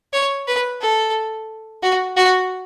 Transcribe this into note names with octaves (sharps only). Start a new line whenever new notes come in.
C#5
B4
A4
F#4
F#4